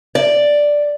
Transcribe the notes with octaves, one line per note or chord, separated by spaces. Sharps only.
D5